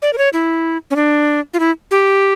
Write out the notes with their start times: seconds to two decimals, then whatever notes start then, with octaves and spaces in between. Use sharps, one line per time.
0.02 D5
0.13 A#4
0.18 C#5
0.33 E4
0.91 C#4
0.96 D4
1.54 F4
1.60 E4
1.91 G4